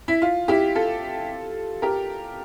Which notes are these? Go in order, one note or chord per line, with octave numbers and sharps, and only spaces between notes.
E4
F4
E4 G4
F4 A4
G4 A#4